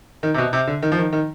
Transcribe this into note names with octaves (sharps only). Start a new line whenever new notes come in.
D#3
C3
B2
C3
D3
D#3
F3
D#3
D#3